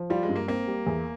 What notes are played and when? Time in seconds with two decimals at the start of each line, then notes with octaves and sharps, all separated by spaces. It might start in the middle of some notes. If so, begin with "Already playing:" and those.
Already playing: F3
0.10 G3 F4
0.23 G#3
0.29 G2
0.36 A#3
0.48 A#3 C4
0.67 G3
0.87 E2